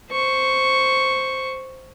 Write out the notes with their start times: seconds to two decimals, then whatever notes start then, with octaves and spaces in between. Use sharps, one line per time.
0.11 C5 C#6